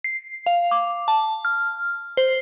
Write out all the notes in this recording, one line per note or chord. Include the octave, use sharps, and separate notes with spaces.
C7
F5
D6
A5
F6
C5